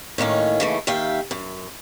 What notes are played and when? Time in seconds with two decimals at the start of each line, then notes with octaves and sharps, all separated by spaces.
0.18 A2 D#3 A#3 C#4
0.60 C#3 E3 A3
0.87 D#2 D#3 E5 F5 G5
1.31 F#2